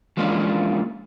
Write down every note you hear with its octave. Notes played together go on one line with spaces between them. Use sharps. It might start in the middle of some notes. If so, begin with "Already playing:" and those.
E3 F3 G#3 A#3 C#4 D4